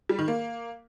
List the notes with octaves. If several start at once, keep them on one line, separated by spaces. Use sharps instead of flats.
G3
D#3
A#3